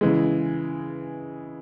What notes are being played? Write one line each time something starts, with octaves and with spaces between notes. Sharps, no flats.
C#3 E3 G#3